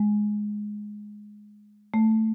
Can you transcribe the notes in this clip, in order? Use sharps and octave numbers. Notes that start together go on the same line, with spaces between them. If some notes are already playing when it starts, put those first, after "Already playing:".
Already playing: G#3
A3